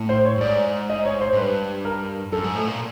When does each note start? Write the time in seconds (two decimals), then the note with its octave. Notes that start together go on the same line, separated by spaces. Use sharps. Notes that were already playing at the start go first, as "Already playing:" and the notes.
Already playing: A2
0.09 C5
0.25 C#5
0.36 G2
0.41 G#2 D5
0.90 D#5
1.05 C#5
1.21 C5
1.33 G#2
1.37 G2 B4
1.85 A#4
2.32 F#2 A4
2.44 G#2
2.56 A2
2.68 A#2